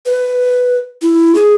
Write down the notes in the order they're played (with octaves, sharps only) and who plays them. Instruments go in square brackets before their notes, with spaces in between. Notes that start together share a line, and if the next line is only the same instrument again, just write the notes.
[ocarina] B4
E4
G#4